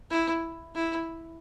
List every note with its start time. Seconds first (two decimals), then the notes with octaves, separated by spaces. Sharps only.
0.10 E4
0.75 E4